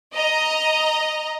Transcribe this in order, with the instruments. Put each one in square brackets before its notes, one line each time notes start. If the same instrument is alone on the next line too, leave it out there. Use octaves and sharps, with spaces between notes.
[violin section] D#5 A#5